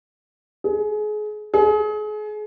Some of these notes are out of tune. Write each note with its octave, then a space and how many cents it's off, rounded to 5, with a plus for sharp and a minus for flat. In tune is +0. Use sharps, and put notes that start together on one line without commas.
G#4 +30
G#4 +35